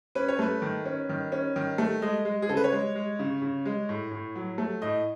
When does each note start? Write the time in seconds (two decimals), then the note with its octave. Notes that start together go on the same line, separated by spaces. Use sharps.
0.15 C#4 B4
0.28 C#5
0.39 A3 B4
0.62 D#3
0.85 C#4
1.09 D#3
1.32 C#4
1.56 D#3
1.78 A3
2.02 G#3 D#5
2.25 G#3
2.42 G#4
2.49 C#3 A4
2.57 B4
2.64 C#5
2.73 G#3
2.95 G#3
3.19 C#3
3.42 C#3
3.65 G#3
3.89 A2
4.11 A2
4.35 F#3
4.58 A3
4.82 A2 D#5